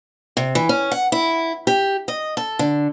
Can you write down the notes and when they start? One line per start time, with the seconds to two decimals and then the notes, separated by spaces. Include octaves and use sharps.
0.37 C3
0.55 E3
0.69 C#4
0.92 F#5
1.12 E4
1.67 G4
2.08 D#5
2.37 A4
2.59 D3